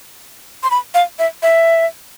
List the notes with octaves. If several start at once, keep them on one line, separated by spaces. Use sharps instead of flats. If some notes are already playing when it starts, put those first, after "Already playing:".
C6
B5
F5
E5
E5